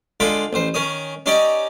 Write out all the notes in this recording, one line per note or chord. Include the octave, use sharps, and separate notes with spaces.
D3 G#3 F4 G5 B5
A1 C5
D#3 C#4 D#6
C#4 D#4 G4 D5 D#5